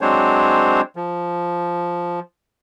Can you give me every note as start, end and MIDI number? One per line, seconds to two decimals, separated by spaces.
0.01 0.81 54
0.01 0.81 56
0.01 0.81 60
0.01 0.81 62
0.01 0.81 72
0.01 0.81 73
0.96 2.20 53